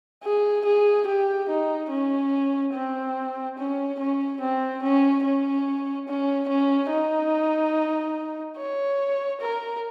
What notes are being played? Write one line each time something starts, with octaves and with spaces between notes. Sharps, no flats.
G#4
G#4
G4
D#4
C#4
C4
C#4
C#4
C4
C#4
C#4
C#4
C#4
D#4
C#5
A#4